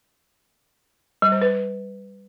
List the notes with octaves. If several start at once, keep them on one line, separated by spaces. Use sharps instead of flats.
G3
C5
B4